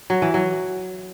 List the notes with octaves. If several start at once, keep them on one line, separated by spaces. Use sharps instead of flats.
F#3
E3
F#3